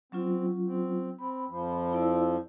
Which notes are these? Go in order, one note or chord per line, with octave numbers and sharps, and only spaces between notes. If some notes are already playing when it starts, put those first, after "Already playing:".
F#3 C4 C#4 F4
C4
C4 B5
F2 F3
E4 D5 E6